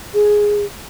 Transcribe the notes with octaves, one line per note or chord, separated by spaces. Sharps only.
G#4